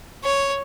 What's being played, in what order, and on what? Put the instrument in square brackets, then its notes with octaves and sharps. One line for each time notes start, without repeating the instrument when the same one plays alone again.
[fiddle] C#5